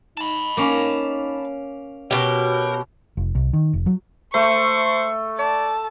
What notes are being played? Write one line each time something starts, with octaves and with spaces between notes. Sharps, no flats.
D#4 A5 B5
A#3 C#4
B2 F#4 G4 A#4 C#5
F1
C2
D#3
F1
F#3
A3 C5 C#6
D5 A5